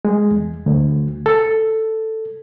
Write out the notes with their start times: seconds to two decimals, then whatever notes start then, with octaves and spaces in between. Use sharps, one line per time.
0.05 G#3
0.31 E2
0.66 D2
1.26 A4